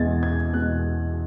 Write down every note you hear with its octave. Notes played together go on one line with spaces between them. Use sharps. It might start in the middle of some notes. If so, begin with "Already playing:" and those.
Already playing: E2 B2 G#3 G#6 A6
G#6
E2 B2 G#3 F#6